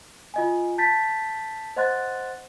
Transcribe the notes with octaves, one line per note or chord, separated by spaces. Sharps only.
F4 D#5 G#5
A5 G6 A6 B6
C5 D#5 F#5 C6 F#6 A6